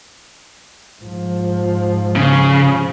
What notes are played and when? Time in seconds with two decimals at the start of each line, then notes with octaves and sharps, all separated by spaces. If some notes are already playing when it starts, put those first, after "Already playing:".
1.01 G#2 F3
2.16 C#3